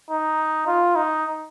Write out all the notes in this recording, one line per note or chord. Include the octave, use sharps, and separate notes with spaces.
D#4
F4
D#4